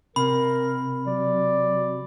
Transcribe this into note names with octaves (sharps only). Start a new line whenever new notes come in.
C3 A#4 B5
F#3 D5